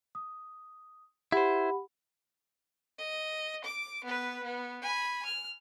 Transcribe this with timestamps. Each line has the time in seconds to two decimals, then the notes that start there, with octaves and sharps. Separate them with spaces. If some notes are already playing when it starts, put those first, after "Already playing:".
0.15 D#6
1.32 E4 G4 C5 F#5 B5
2.98 D#5
3.64 D6
4.04 B3 B4
4.43 B3
4.82 G#5 B5
5.25 F6